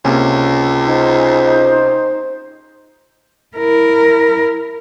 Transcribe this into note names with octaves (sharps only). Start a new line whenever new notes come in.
C#2 C3 A#3 C#4
D#4 C5
E4 A#4